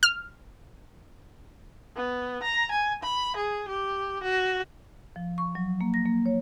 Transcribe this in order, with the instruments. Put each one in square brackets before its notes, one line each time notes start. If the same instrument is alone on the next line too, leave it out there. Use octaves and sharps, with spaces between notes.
[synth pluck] F6
[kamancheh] B3
A#5
G#5
B5
G#4
G4
F#4
[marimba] F3
C#6
F#3
A#3
A#6
A#3
C#5